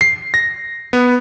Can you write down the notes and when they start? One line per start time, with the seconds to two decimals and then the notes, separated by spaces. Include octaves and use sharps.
0.01 C7
0.34 A#6
0.93 B3